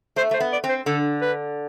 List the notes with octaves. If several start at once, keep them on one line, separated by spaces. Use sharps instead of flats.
A3 C5
A3 C5
B3
D5
C4
C5
D3 A4
B4